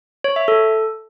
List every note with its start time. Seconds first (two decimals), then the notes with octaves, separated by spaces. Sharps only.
0.24 C#5
0.36 E5
0.48 A4